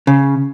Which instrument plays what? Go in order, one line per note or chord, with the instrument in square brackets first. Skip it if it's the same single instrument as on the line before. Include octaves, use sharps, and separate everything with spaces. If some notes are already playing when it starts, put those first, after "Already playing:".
[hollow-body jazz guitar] C#3